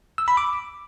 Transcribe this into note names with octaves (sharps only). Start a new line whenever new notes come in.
E6
B5
D6